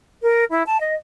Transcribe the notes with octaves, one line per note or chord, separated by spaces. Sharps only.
A#4
E4
A5
D#5